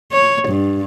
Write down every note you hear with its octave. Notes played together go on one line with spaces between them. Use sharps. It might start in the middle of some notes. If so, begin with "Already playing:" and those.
C#5
G2